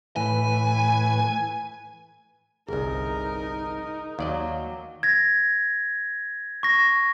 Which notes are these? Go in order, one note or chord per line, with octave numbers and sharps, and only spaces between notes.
A2 E3 B4 G#5
G1 C2 D#4 G#4 A#4
D#2 F#3 D5 D#5 F5
G#6 A#6
C#6 A#6